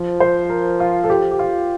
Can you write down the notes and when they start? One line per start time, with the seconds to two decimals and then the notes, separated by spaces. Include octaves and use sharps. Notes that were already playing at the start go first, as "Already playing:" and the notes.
Already playing: F3 C5
0.20 C5
0.50 A#4
0.80 F4
1.04 A4
1.10 G4
1.31 G4
1.39 F4